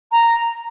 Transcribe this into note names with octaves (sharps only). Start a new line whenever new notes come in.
A#5